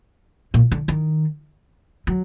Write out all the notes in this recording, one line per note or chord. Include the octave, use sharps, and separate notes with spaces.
A#2
D3
D#3
F#3